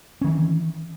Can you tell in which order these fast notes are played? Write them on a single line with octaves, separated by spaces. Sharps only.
C#4 D#3 E3